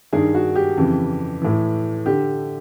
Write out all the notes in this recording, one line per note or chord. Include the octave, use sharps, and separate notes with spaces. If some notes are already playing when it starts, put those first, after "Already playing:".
G2 D#3 G#4
F#4
G4
F2 C#3 E3
A2 E3
D3 G4